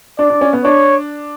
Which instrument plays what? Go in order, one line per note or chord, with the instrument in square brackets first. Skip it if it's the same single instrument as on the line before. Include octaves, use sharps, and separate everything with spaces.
[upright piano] D4 [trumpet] D5
[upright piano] D4
C#4
B3
[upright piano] D4 [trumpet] C#5